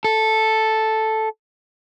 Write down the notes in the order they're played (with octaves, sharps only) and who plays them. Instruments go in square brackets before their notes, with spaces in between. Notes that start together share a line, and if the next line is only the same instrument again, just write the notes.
[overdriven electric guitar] A4